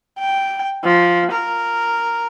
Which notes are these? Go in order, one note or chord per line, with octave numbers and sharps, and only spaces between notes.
G5
F3
A#4